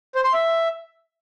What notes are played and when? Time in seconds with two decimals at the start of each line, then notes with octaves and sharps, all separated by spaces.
0.15 C5
0.24 C6
0.33 E5